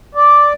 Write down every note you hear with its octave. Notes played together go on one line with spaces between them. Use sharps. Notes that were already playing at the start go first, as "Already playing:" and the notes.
D5